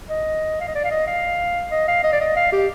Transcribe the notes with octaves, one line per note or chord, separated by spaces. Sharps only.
D#5
F5
D#5
D5
F5
D#5
F5
D#5
F5
D#5
D5
D#5
F5
G4